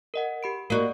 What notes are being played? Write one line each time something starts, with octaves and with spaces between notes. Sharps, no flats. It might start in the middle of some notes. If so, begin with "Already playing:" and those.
A#4 D#5 F#5
G4 B5 D7
A#3 F#4 A#4 D5 D#5